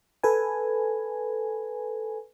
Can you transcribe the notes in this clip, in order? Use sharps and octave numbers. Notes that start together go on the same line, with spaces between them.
A4 B4 G#5